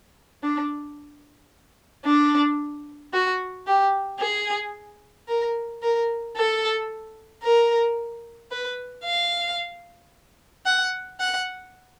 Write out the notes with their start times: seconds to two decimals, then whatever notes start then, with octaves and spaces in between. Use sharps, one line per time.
0.43 D4
2.04 D4
3.13 F#4
3.67 G4
4.20 G#4
5.28 A#4
5.82 A#4
6.36 A4
7.42 A#4
8.51 B4
9.04 F5
10.65 F#5
11.20 F#5